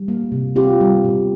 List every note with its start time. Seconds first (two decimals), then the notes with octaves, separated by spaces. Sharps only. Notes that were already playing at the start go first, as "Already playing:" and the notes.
Already playing: G3
0.08 A#3
0.32 C3
0.56 C4 F4 G4
0.81 G3
1.05 B2